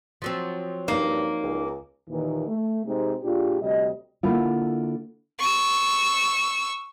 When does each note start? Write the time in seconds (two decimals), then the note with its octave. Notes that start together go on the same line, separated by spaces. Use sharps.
0.22 F3 F#3 C4
0.88 G2 A#3 D#4 D5
1.43 C#2
2.08 D#2 A#2 D#3 E3
2.47 A3
2.84 C3 G#3 C4 D#4 G#4
3.22 A#2 D4 F4 G4 G#4
3.60 D2 C3 G3 D#5
4.23 D3 A#3 E4 F4
5.40 C#6 E6